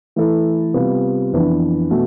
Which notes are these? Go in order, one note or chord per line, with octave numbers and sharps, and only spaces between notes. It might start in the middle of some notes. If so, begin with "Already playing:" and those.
E3 A3 E4 A4
C3 G3 B3 F4
F2 E3 B3 D4
B2 A3